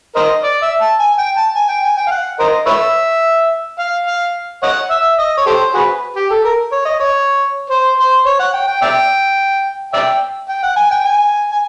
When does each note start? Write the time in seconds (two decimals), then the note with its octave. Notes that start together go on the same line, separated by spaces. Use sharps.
0.16 A#4 C5 D#5
0.44 D5
0.62 E5
0.81 A5
0.99 G#5
1.18 G5
1.36 A5
1.55 G#5
1.69 G5
1.83 G#5
1.97 G5
2.07 F5
2.11 F#5
2.39 A#4 C5 D#5
2.66 B4 C#5 E5
3.79 F5
4.06 F5
4.63 C#5 D#5 F#5
4.90 E5
5.18 D#5
5.37 C#5
5.46 G4 A4 C5
5.74 F#4 G#4 B4
6.16 G4
6.31 A4
6.44 A#4
6.72 C#5
6.86 D#5
7.00 C#5
7.70 C5
7.98 C5
8.26 C#5
8.40 F#5
8.54 G5
8.68 G5
8.82 D5 E5 G5
9.93 D5 E5 G5
10.49 G5
10.63 F#5
10.77 G#5
10.91 G5
11.05 G#5
11.52 G#5